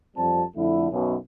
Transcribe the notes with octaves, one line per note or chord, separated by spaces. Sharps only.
F2 G3 C4 F4 G4 A5
F2 D3 A3 E4
B1 F#2 B2